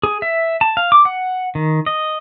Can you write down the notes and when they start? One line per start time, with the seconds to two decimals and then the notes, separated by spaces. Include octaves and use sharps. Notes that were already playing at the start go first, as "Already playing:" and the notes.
0.03 G#4
0.22 E5
0.61 A5
0.77 F5
0.92 D6
1.05 F#5
1.55 D#3
1.86 D#5